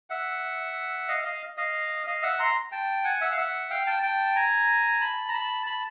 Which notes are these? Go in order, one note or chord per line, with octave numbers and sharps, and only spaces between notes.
E5 F#5
D#5 F5
D#5 F5
D#5 F5
D#5 F5
E5 F#5
A#5 C6
G5 A5
F#5 G#5
E5 F#5
F5
E5 F#5
F5 G5
G5 A5
G5 A5
G#5 A#5
A5 B5
A#5
A5 B5
A5 B5